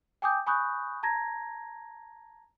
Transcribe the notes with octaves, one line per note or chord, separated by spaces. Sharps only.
G5 G#5 D6 D#6 G6
G#5 B5 C#6 D#6 F#6 G6
A5 A#5 G#6 A#6